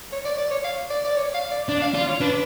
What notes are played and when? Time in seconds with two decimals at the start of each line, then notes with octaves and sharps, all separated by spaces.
0.12 C#5
0.25 D5
0.38 D5
0.51 C#5
0.64 F5
0.90 D5
1.05 D5
1.17 C#5
1.34 F5
1.51 D5
1.68 D4 D5
1.82 F5
1.94 F4 D5
2.08 C#5
2.21 D4 B4